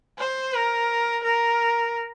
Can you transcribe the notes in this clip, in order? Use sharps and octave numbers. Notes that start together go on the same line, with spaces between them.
C5
A#4
A#4